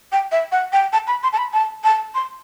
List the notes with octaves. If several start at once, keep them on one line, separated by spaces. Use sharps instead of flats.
G5
E5
F#5
G5
A5
B5
C6
A5
B5
A5
A5
C6